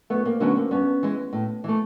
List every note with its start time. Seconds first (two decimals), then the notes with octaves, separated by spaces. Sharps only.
0.10 F#2 A3 B3
0.25 A#3 C4
0.40 D3 F#3 A3 B3 C#4
0.56 A#3 C4
0.71 G2 B3 C#4
1.03 E3 G#3
1.33 A2
1.64 E3 A3